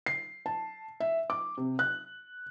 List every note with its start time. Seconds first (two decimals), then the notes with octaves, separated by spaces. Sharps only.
0.06 C7
0.46 A5
1.00 E5
1.30 D6
1.57 C3
1.79 F#6